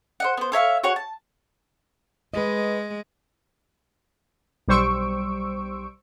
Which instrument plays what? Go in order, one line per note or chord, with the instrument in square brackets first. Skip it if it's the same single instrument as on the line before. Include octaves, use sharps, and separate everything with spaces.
[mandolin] C5 D#5 F#5
B3 C5
A4 C#5 E5 F5
F#4 G#4 C#5 F#5
A5
[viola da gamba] G#3 [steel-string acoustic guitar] B4 D#5
[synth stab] B1 G3 C5 C#6 E6 D7